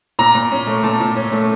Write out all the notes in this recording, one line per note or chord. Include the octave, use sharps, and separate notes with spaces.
A#2 A#5
A#2
C#4
A3
A#2 A5
A#2
C#4
A3